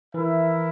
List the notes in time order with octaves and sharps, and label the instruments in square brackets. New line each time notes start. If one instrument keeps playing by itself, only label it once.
[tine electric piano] E3 [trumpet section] E4 A#4 E5